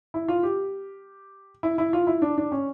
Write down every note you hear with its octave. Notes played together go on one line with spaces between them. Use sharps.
E4
F4
G4
E4
E4
F4
E4
D4
D4
C#4